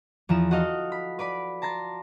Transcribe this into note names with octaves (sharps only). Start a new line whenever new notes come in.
E2 F3 A#5 E7
F#4 A4 D#5 F5
B5
B4 D5 B5
A5 A#5 C6 A6